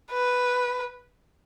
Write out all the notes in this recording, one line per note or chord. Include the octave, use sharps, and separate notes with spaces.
B4